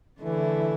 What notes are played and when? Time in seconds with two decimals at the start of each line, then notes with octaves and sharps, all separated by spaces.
0.21 D3 E3 A3 E4